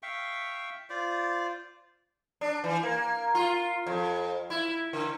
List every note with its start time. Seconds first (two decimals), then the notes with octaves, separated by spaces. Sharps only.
0.03 E5 F5 G5 C#6
0.90 F4 C5 D5
2.41 D4
2.64 E3
2.83 A#3
3.35 F4
3.87 F2
4.50 E4
4.93 D3